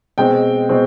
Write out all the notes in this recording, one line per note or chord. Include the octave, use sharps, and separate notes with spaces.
B2 G#3 C4 G5
B2 G#3 C4